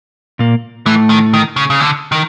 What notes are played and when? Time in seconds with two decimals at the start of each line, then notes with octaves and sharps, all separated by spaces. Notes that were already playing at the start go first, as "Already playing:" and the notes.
0.39 A#2 A#3
0.86 A2 E3 A3
1.10 D#3
1.34 D#3
1.56 C#3
1.70 C#3
1.80 D3
2.12 D#3